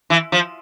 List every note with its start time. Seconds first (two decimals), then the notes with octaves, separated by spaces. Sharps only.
0.10 E3
0.32 F3